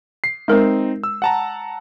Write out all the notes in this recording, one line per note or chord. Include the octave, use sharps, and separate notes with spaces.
C7
G#3 C4 D#4 A#4
E6
F#5 A5 A#5